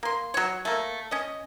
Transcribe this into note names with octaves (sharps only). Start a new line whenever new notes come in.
A#3 C6
F#3 C#5
A3 A#3
C#4 D#5